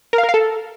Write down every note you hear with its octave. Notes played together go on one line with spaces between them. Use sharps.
A#4
F5
A#4
F5
A4